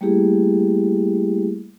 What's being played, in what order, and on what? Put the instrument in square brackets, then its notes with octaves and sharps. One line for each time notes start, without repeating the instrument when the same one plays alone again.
[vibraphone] G3 A3 A#3 E4 G4 G#4